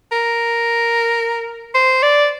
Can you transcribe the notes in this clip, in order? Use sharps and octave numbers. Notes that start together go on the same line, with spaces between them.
A#4
C5
D5